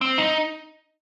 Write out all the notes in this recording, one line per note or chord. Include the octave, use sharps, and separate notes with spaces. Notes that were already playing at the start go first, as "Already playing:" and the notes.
C4
D#4